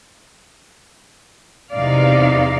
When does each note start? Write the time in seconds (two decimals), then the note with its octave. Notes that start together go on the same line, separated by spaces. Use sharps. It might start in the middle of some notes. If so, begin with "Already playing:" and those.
1.72 E2 C3 D#4 D5 F5